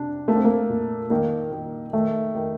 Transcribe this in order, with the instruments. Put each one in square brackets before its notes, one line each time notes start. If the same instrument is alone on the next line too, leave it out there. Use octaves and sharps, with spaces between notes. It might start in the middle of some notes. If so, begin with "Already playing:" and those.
Already playing: [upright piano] C3 D4
[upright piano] A3 [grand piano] A#3
[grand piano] C4
A#3
[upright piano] A#2
[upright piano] D#3 [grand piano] A#3
[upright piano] D#3
[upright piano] D#3 [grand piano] A3
[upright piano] D#3